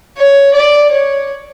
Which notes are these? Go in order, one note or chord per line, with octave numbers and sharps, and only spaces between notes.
C#5
D5
C#5